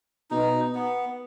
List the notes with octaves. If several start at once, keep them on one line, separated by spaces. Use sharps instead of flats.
B2 D#4
B3